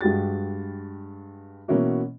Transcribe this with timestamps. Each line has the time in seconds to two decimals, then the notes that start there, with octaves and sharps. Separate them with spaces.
0.01 G2 G#3 F#4 G4 A6
1.68 B2 E3 A#3 C#4 E4 F#4